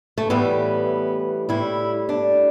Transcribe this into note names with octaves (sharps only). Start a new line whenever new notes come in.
A3
A2 E3 G3 B3
A2 G3 E4
D4